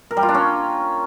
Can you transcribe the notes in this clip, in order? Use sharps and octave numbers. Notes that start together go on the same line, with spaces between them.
A#4
G3
F4
D4
C#4